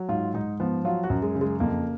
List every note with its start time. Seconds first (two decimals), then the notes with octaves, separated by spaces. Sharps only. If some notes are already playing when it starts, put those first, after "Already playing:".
Already playing: F#3
0.09 G#2 F4
0.34 G#2 D#4
0.60 F3 B3
0.85 F#3 F4
1.04 F#4
1.10 F#2
1.22 G#3
1.35 C#3
1.41 G#3
1.60 F2 A#3